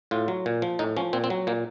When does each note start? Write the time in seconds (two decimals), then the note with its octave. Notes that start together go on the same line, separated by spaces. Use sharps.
0.11 A2 F4
0.28 F#3
0.46 A#2
0.62 F3
0.79 A2 D#4
0.97 F3 C#4
1.13 A#2 C4
1.24 C4
1.30 F#3
1.47 A#2 A#3